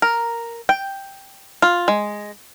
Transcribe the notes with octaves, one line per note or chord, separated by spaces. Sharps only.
A#4
G5
F4
G#3